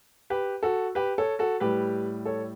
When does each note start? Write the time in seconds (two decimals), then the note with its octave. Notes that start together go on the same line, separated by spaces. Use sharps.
0.30 G4 B4
0.63 F#4 A4
0.95 G4 B4
1.18 A4 C#5
1.39 F#4 A4
1.60 A2 G3 G4 B4
2.25 A4 C#5